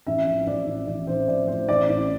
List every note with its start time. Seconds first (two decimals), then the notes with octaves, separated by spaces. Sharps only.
0.07 A1 E5
0.27 F3
0.47 A1 D5
0.67 A1
0.87 A1 D5
1.07 A1 C5
1.28 F3 D5
1.48 A2 C5
1.69 A1 D5
1.89 A1